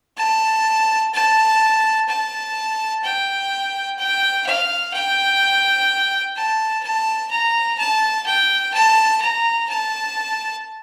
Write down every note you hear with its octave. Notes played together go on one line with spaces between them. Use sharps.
A5
A5
A5
G5
G5
F5
G5
A5
A5
A#5
A5
G5
A5
A#5
A5